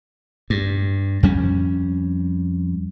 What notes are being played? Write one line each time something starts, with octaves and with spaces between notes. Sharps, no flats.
G2
F2 G3 C#4